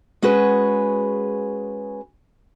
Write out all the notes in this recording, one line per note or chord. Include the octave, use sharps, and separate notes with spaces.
G#3 C#4 F#4 G#4 B4